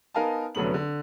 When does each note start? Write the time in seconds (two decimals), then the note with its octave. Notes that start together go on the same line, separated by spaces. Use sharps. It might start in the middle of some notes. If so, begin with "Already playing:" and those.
0.14 B3 D#4 A#4 F5 G#5 A5
0.55 F1 D3 F#3 A3 B3 F#7
0.74 D3